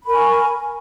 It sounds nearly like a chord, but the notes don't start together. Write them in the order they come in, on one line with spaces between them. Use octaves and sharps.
B5 A#4 G#5 C#6